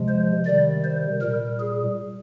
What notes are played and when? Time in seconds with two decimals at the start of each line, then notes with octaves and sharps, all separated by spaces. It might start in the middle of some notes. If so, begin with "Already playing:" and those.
Already playing: C3 F3 G#3
0.09 C5
0.46 C3 D#3 G3 D5
0.85 C5
1.22 A#2 G3 A#4
1.60 G#4